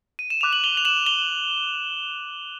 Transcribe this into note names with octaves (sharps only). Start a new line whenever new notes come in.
D#7
E7
D6 F#6 F7
F#7
F7 G7
F7
E7 F#7
F7 G7